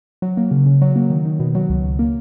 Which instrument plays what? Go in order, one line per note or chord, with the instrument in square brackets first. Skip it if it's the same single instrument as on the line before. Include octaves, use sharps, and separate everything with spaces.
[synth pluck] F#3
A#3
C#3
C#3
F#3
A#3
D#3
D#3
B2
F#3
C#2
C#2
A#3